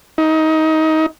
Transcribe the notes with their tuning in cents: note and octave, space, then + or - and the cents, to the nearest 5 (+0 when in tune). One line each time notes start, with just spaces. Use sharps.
D#4 +25